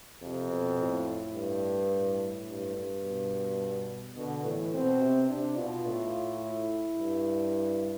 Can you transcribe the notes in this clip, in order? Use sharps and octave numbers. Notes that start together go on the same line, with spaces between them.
F2 C3
B2
A2
G2
A2
G2
G2
B2
B2 D3
A2 E3
B2 C4
C3
C3 D4
B2 F4
A2
E4
G2